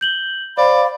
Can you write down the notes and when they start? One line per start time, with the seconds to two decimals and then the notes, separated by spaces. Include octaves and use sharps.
0.01 G6 F#7 G7
0.57 C5 D5 F5 B5